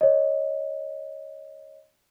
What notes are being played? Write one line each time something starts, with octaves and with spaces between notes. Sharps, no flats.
C#5 D#5